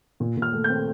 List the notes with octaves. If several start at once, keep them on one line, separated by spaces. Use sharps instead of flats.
A#2
A#2
F6
A3
C4 G6